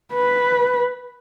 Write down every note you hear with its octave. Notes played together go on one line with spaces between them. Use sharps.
B4